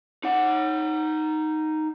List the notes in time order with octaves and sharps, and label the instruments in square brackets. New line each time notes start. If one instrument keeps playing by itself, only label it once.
[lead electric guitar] D#4 F#5